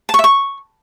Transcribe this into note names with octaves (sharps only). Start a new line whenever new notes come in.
A5
C#6
E5
C#6